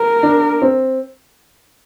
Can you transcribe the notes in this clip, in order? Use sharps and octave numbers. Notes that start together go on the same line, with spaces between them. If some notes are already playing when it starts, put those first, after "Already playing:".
Already playing: A#4
D4
C4